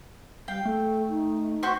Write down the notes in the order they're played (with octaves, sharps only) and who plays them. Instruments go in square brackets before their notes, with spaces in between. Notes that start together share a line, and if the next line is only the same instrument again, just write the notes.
[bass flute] G3 [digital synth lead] F5 [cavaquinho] G5
[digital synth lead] A3 [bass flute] A4
[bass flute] D#4
[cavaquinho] F#4 C5 C#6 [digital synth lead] B6